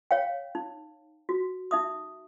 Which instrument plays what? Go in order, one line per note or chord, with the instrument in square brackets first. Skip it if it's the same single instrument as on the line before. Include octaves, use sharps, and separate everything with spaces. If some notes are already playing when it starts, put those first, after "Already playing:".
[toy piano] C#5 F5 G5
D#4
F#4
D#4 E5 D#6